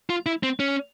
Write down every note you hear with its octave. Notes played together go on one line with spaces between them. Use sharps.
F4
E4
C4
C#4